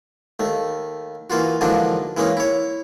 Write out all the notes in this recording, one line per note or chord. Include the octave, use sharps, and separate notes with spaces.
D#2 A3
E3 A#3 F4 F#4
D2 G#2 E3 F3 A#3 D4
E3 G#3 A#3 C#4 D#4
E4 C#5